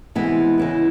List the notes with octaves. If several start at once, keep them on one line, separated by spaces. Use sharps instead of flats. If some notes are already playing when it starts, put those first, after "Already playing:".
C3 E3 G#3 B3
C#3 E3 G#3